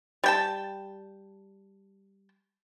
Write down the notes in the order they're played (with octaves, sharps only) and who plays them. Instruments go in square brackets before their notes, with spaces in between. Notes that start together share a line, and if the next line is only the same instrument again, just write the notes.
[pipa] G3 G5 A5